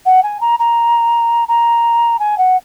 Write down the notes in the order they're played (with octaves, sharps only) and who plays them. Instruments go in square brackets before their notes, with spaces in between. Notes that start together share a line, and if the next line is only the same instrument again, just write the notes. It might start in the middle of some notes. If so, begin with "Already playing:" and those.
[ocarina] F#5
G#5
A#5
A#5
A#5
G#5
F#5